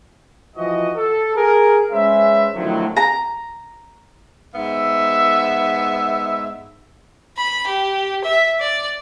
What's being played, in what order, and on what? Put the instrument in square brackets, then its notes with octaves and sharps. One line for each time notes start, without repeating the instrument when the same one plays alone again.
[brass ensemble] E3 F3 F#4 D#5
A4
G#4 A#4
G#3 C#4 B4 C5 E5
E2 A2 D3 D#3 F3 F#3
[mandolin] A#5
[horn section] G#2 B3 E5
[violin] B5
G4
E5
D5